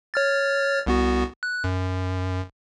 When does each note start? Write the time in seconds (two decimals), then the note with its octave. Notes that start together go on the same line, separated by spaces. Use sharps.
0.14 C#5 F6 A6
0.86 C2 B3 F#4
1.43 F#6
1.64 F#2